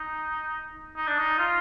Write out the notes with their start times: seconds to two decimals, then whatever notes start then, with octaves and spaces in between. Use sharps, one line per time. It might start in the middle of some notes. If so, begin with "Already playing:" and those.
Already playing: D#4
0.96 D#4
1.07 D4
1.18 D#4
1.39 F4